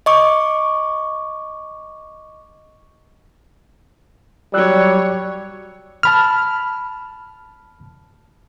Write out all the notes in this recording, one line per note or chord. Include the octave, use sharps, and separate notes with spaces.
D#5 C#6 D6
F#3 G3 C#5 D5 E6 F#6
A5 B5 F6